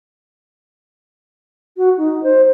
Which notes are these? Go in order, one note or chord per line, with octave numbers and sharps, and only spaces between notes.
F#4
D#4
C5